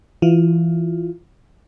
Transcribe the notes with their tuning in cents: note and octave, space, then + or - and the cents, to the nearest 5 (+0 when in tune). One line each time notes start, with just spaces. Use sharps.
E3 +20 F4 +10